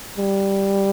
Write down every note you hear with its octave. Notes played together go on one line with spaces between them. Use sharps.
G3